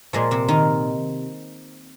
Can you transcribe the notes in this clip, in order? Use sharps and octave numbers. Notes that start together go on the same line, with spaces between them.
A#2 F3 G#3
C3 C4
D#3 D#4